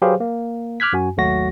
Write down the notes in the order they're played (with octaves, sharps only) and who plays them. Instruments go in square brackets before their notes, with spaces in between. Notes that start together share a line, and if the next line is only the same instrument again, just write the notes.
[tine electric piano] F#3 G4 G#4 B4 C5 F5
A#3
D6 F6 F#6 G#6 B6
F#2 F#4 G#5
G#1 D#2 F#3 A3 F#4 A#6